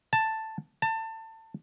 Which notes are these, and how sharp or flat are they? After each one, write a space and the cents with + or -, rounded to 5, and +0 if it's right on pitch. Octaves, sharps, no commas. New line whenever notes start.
A5 +5
A5 +25